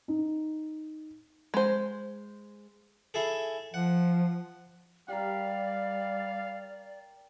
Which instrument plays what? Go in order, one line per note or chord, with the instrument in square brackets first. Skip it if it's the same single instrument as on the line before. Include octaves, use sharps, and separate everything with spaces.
[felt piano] D#4
[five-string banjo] G#3 C5
[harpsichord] E4 G#4 A4
[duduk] F3 [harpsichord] F#5
[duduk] G3 [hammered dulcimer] G4 A#4 [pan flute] D5 [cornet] F5